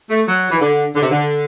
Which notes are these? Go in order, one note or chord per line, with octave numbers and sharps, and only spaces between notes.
A3
F#3
E3
D3
D3
C3
D3